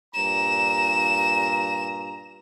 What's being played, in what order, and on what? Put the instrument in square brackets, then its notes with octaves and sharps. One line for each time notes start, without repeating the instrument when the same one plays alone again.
[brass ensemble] G2 A#2 A#5 [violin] E7